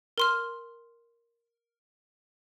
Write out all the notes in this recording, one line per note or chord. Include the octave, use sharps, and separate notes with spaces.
A#4 C6 F6